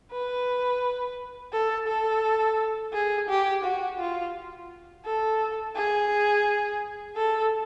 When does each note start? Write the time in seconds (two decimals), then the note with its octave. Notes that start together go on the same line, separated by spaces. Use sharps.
0.12 B4
1.53 A4
1.87 A4
2.93 G#4
3.29 G4
3.64 F#4
3.99 F4
5.05 A4
5.75 G#4
7.16 A4